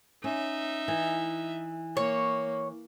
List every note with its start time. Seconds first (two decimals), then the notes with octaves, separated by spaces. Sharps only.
0.24 C#4 D#4 E5
0.88 E3
1.97 A#3 C#5